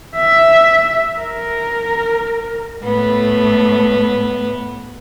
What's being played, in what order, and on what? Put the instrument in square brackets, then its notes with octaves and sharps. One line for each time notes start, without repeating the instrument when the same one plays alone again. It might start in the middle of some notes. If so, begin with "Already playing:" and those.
[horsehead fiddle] E5
A#4
[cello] A2 [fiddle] B3